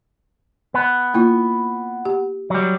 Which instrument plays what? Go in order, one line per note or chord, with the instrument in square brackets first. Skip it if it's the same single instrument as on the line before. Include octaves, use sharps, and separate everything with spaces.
[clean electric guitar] B3
[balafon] A#3 E4 F4
G4
[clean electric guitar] F#3 G3